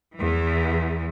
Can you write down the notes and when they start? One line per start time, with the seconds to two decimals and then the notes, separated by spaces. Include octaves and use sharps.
0.15 E2 E3